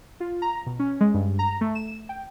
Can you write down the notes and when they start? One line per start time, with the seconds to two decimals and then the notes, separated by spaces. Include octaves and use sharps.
0.20 F4
0.42 A#5
0.66 B2
0.79 C#4
1.01 G#3
1.14 G2
1.39 A#5
1.61 A3
1.75 E7
2.09 G5